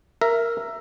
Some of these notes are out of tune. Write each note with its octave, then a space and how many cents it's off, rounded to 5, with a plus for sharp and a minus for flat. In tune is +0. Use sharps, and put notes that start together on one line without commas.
A#4 +0 E5 +15